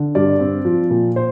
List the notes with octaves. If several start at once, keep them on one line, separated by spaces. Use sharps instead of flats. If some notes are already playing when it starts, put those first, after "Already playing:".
Already playing: D3
G2 D5
C4
F3
A#2
C5